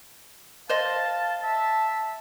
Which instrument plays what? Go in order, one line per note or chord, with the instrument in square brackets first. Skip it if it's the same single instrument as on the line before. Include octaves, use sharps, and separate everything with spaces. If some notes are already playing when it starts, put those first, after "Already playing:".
[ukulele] C5 D#5 [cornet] F5 [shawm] A5
[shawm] E5 [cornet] A5